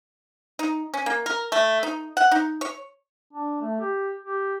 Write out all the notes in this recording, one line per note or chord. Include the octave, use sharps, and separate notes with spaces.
D#4
C#4
A#3
A#4
A3
D#4
F#5
D#4
C#5
D4
A3
G4
G4